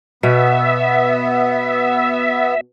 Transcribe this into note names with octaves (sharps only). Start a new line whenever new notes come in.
B2 B3 E5